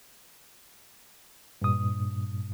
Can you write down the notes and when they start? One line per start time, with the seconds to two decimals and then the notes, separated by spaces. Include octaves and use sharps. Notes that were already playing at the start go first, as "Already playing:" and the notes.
1.62 G2 A#2 D#6